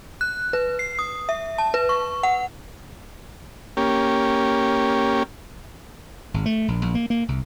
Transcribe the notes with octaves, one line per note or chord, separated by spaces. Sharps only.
F#6
B4
C7
D#6
E5
A5
B4
C#6
F#5
A#3 C#4 G4
G#1
A3
A#1
A#1
A#3
A#3
C2